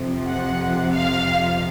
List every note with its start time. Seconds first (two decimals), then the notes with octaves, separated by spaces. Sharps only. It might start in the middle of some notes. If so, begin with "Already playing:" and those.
Already playing: F2 C3 F3
0.26 F#5
0.91 F5